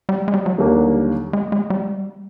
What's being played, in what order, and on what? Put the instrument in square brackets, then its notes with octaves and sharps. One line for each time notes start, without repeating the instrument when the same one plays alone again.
[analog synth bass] G3
G#3
G3
F#3
[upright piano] D#2 D3 G3 A#3 D4
[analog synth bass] G#3
G#3
G3